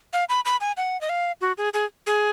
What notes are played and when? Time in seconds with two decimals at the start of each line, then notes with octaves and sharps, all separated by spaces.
0.13 F5
0.29 B5
0.45 B5
0.61 G#5
0.77 F#5
1.01 D#5
1.09 F5
1.41 F#4
1.58 G#4
1.74 G#4
2.07 G#4